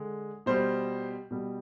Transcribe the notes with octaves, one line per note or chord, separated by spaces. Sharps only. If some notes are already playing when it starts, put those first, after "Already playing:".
Already playing: D3 G#3
B2 G3 C5
B2 G3